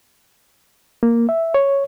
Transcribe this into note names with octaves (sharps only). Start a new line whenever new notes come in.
A#3
E5
C#5